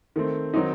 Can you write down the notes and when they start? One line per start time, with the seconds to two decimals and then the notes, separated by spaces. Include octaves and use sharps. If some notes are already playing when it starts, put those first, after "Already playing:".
0.16 D#3 A3 C4
0.54 D#3 F#3 C4 D#4